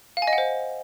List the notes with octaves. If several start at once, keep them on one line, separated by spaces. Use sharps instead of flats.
F5
G#5
D#5
F#5
C5